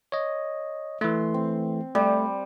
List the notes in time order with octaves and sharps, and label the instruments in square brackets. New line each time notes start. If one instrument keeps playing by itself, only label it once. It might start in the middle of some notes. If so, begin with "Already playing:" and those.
[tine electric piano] C#5 D#5
[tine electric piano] E3 A3 [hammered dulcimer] C6
[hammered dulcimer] C4
[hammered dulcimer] G3 [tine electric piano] A3